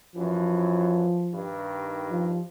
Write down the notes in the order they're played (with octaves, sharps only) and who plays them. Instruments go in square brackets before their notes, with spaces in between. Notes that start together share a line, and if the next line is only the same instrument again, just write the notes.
[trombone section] F#2 E3 [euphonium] F3
[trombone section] G2 D#3
[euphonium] F3